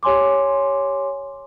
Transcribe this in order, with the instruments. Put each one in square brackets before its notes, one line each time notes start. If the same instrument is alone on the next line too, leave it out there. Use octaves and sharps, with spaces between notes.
[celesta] G4 C#5 G#5 C6 D6